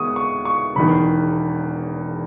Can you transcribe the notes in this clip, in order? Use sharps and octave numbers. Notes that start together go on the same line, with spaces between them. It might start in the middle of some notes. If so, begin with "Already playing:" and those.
Already playing: D#2 G#3 B3 C#6 D#6
C#6
C#6
E1 E2 D#3 B5